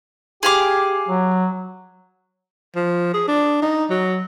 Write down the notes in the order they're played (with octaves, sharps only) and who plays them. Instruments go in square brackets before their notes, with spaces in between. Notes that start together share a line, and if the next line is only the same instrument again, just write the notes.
[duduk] G4 [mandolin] G#4 F5 D6
[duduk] F#3
[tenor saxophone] F3
G#4
D4
D#4
F#3